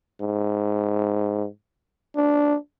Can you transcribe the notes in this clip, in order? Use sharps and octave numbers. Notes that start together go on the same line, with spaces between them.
G#2
D4